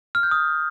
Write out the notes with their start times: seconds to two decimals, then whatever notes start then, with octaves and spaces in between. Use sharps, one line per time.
0.15 F6
0.23 G6
0.31 D#6